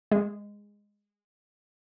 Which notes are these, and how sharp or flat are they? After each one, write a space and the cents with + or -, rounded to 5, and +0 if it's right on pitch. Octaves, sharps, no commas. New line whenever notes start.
G#3 -15